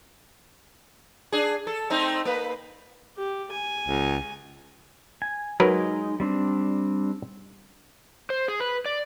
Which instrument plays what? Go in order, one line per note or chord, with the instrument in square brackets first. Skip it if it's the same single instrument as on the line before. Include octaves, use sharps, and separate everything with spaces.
[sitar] D4 G#4
A4
A3 C4 D#4
A#3 B4
[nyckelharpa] G4
G#5
[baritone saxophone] C#2
[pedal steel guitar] G#5
[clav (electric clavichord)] F#3 A#4 B4 [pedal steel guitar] G#3 D#4
[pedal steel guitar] G3 C4 D4
[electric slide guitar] C5
G#4
B4
D5